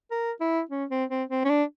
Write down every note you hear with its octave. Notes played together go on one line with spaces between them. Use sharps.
A#4
E4
C#4
C4
C4
C4
C#4
D4